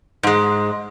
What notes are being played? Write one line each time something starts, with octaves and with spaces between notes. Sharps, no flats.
G#2 G#3